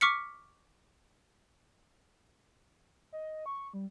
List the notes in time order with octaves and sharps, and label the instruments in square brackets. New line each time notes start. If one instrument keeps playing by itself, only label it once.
[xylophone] C#6 D6 F6 B6 C#7
[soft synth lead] D#5
C#6
G3